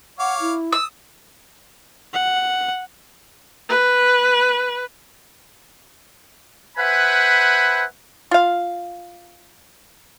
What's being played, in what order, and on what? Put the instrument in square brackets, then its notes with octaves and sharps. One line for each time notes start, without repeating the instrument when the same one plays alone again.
[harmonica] C#5 F5 D6 [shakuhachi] F#5
[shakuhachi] E4
[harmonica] D#6 [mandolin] E6
[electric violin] F#5
[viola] B4
[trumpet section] B4 C5 E5 F#5 G#5 B5
[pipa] F4 F5